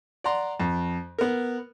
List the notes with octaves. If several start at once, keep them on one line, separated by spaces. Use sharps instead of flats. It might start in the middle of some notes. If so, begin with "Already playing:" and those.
D5 F#5 A#5 C6
F2
B3 A#4